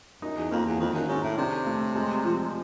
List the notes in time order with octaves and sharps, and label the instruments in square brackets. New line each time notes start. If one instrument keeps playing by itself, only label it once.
[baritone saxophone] F#2 [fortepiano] D#4
[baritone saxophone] E2
[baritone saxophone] F2 [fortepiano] A#3
[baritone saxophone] E2
[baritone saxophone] F2 [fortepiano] D#3
[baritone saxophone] F#2
[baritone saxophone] G#2 [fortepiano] C#4
[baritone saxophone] A2
[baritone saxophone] C3 [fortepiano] D4
[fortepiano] A3
G#3
F3